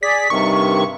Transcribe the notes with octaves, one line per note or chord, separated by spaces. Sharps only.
G#4 D5 B6
G2 C3 D#3 C#6